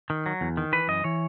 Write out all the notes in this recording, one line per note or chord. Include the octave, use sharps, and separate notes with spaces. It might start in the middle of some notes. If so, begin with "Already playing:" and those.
D#3
F#3
E2
D#3
E3 B4
F#2 D#5
E3 C#5